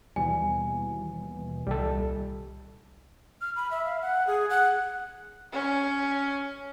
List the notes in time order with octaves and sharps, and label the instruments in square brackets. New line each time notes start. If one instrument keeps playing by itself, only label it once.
[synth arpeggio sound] D#2 B2 E3 [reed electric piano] G3 [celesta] G#5
[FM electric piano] C2 [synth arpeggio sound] A#2 D#3 [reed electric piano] G3 G4 A4
[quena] F6
B5
E5
F5
F#5
G#4
F#5
[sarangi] C#4